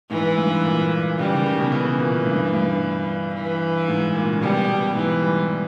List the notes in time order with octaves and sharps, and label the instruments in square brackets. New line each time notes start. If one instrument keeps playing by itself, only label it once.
[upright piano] G#2 [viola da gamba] E3
[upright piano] G2
A#2
[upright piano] C#3 [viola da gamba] G3
[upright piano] D#3
C#3
B2
[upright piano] C#3 [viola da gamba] E3
[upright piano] A#2
G2
G2
[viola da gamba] E3
[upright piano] G#2
A#2
C#3
[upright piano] B2 [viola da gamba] G3
[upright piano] B2
[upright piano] G#2 [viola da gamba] E3
[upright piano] G3